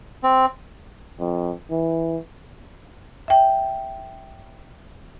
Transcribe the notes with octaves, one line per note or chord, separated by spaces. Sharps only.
C4
F2
E3
E5 G5